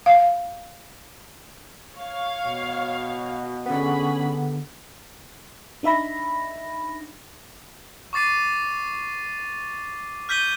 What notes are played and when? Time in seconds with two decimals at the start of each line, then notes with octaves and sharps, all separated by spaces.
0.06 F5
1.94 C#5 F5
2.46 B2
3.66 D3 B3 C#4 G#4 B5
5.83 D4 D#4 E5 B5 A#6
8.13 C#6 D6 A6 C7 D#7
10.29 F6 G6 B6 D#7 G7